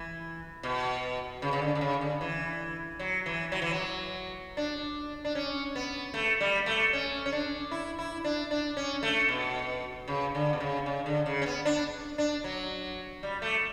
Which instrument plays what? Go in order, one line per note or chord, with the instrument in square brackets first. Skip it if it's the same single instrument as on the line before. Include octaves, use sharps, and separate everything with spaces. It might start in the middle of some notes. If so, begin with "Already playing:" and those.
Already playing: [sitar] E3
B2
C#3
C#3
D3
D3
C#3
D3
E3
F#3
E3
F#3
E3
F#3
D4
D4
C#4
B3
A3
G3
A3
C#4
C#4
D4
E4
E4
D4
D4
C#4
A3
B2
C#3
D3
B2
C#3
C#3
D3
C#3
C#4
B3
D4
D4
F#3
G3
A3